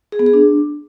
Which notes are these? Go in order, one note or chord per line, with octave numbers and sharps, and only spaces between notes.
G#4
B3
G#4
D4